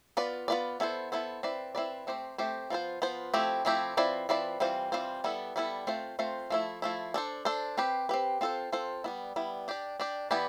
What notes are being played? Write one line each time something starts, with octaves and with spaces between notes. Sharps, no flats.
B3 F4 B4 D5
B3 F4 B4 D5
B3 E4 A4 C5
B3 E4 A4 C5
C4 E4 B4 D5
C4 E4 B4 D5
A3 C4 G4 C5
A3 C4 G4 C5
F3 B3 F4 C5
F3 B3 F4 C5
F3 A3 C4 E4 G4
F3 A3 C4 E4 G4
F3 C4 E4 B4 D5
F3 C4 E4 B4 D5
E3 G3 C4 F4 C5
E3 G3 C4 F4 C5
G3 B3 E4 A4
G3 B3 E4 A4
A3 C4 F4 C5
A3 C4 F4 C5
F3 A3 E4
F3 A3 E4
D4 A4 C5
D4 A4 C5
C4 G4 B4
C4 G4 B4
C4 F4 A4 C5
C4 F4 A4 C5
G3 B3 E4
G3 B3 E4
D4 G4 D5
D4 G4 D5
E3 B3 E4 G4 D5